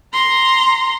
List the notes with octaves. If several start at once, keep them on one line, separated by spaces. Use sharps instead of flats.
A#5 C6